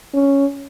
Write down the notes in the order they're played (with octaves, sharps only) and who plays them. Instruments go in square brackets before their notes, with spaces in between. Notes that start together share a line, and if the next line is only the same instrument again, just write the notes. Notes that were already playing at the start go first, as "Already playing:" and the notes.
[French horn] C#4